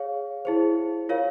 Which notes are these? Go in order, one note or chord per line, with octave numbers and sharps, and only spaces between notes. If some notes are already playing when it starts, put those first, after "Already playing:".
Already playing: G#4 C#5 F5
E4 G#4 C5
F4 A#4 C#5 F5